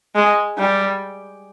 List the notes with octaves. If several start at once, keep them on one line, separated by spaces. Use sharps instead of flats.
G#3
G3